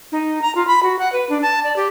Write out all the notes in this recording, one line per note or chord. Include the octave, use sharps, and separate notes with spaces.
D#4
A#5
F4
B5
F#4
F#5
B4
D4
A5
D5
G4